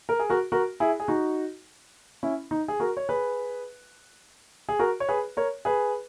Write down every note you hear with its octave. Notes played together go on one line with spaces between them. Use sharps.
A#4
G#4
F#4 A#4
F#4 A#4
E4 G#4
G#4
D#4 F#4
C#4 E4
D#4
G#4
F#4 A#4
C#5
G#4 B4
G#4
F#4 A#4
C#5
G#4 B4
A#4 C#5
G#4 B4